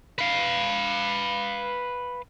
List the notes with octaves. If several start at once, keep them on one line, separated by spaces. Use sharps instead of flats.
B4 F5